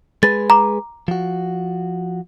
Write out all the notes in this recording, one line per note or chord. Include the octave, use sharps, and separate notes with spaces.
G#3 G#4 B4 A6
A#5 D6
F3 F#4